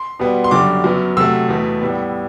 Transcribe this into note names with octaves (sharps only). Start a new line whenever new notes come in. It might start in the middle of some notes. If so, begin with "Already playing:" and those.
Already playing: C6
B2 G3 B3
C6
F#2 D3 G3 D6
F#2 F#3 B3
C3 F#3 A3 E6
E2 B2 A3
A2 G3 B3